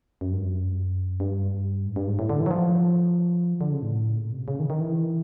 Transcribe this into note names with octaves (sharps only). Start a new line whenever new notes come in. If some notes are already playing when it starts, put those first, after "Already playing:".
F#2
G2
F#2
G2
G#2
G2
G#2
A2
D3
E3
F#3
F3
D3
C#3
A2
A#2
C3
C#3
D#3
D#3
E3